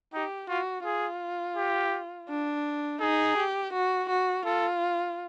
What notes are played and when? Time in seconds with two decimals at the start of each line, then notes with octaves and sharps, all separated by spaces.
0.13 D#4 G4
0.49 F4 F#4
0.85 F4 G#4
1.57 G4
2.29 D4
3.01 D#4 G#4
3.37 G4
3.73 F#4
4.09 F#4
4.45 F4 A4